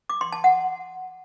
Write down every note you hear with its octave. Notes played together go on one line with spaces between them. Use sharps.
D6
C6
A5
F#5